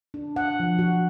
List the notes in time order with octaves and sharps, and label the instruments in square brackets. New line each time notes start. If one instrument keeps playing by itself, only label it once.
[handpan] D4
F#5
F3
F#4